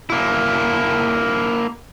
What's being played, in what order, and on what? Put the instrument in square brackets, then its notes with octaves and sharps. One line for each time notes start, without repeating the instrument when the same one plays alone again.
[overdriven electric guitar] A#3 E4